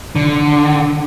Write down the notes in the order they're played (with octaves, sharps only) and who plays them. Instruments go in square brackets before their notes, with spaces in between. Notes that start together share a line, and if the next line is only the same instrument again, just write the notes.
[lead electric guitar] D3